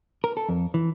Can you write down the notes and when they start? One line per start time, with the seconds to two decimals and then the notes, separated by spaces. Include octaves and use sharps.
0.24 A#4
0.37 A4
0.49 F2
0.74 E3